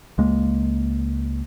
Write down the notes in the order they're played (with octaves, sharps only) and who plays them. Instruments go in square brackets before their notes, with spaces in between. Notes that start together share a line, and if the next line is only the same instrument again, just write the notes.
[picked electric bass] C#2 G#3 A#3